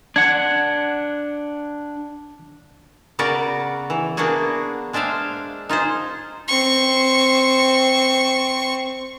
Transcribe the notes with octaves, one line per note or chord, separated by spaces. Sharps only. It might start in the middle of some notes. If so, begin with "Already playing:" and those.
D4 F#5 G#6
C#3 B3 F#4 A#4 B4 D5
E3
A#3 B3 D4 F#4 G#4
G#3 D4 C5 E5 F5
D#4 F4 G#4 C5
C4 C#6